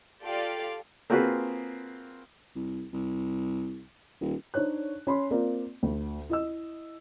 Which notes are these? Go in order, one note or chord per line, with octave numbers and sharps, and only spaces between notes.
F4 G4 A4 D5 F5
A#3 C4 F4 F#4 G#4 B4
C2
C2
D#1
D4 D#4 C5 C#5 F#6
C#4 B5 C6
A#3 C4 F4 A#4 D5
D2
E4 D#5 E6